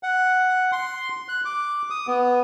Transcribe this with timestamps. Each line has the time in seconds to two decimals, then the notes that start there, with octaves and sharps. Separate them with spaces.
0.03 F#5
0.72 C6
1.29 F#6
1.45 D6
1.90 D#6
2.07 B3